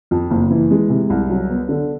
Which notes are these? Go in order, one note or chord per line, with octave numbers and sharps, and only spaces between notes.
F2
F#1
E3
G#3
C3
C2
F#3
B3
D3